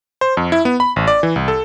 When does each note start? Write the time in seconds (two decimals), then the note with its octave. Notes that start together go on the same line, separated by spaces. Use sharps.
0.21 C5
0.37 F2
0.52 E4
0.65 B3
0.80 B5
0.96 A1
1.07 D5
1.23 E3
1.36 C2
1.48 A4